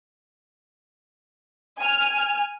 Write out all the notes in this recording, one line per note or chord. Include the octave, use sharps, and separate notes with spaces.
G#5 F6